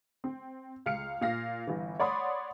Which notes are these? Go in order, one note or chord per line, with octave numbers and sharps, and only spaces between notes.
C4
C#2 F5 F6 C#7
A#2 F5 A#6
G1 E3
C#5 D5 F#5 B5 C6 D#6